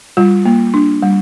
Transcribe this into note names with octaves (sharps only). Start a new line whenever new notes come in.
G3 F4
A#3
D4
G3